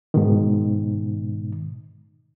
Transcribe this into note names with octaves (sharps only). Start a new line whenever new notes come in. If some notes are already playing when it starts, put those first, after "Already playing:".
G#2 B2 D#3